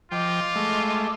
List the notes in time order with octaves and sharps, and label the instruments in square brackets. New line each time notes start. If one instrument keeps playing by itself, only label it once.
[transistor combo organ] F3 G5 [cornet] F4 [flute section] D#5 D6
[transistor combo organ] G#3 A3